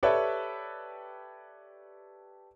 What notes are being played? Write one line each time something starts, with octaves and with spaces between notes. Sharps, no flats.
G4 A4 B4 C#5 D5 E5